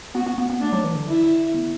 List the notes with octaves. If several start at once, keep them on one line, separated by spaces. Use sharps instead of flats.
B3 F#4
B3
B3
B3
A3 D4
F#3
E3
D3
E4
B3